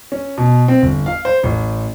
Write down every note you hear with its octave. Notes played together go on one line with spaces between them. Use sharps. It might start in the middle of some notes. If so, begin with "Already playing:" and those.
C#4
B2
C4
G1
F5
C5
A1